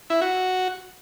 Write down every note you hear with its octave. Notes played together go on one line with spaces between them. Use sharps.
E4
F#4